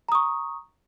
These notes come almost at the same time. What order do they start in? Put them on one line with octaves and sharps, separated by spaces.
A#5 D#6 C#6